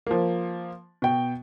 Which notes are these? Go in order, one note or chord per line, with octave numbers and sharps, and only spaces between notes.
F3 A#3
B2 G5